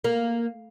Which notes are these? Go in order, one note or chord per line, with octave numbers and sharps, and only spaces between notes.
A#3